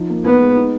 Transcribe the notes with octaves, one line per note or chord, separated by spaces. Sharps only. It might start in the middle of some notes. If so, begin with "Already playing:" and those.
Already playing: F3 D#4
A#3
B3 D#4
G#3
D#4